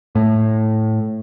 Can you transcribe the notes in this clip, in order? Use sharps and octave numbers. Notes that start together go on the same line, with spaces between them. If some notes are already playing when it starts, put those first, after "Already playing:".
A2